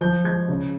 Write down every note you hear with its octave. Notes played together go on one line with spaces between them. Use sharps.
F3 G6
G#3 G#6
C#3